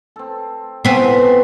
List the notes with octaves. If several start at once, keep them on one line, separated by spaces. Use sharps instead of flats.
C4 A4
E3 F3 A3 B3 C4